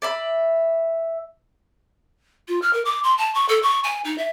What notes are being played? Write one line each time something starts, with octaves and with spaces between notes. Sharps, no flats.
D5 E5 B5
F4
F6
A#4
D6
C6
A5
C#6
A4
C#6
G#5
D#4
E5